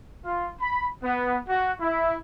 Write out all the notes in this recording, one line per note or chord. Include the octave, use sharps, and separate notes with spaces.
F4
B5
B3
F#4
E4